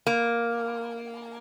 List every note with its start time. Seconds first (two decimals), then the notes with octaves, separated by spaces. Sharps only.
0.07 A#3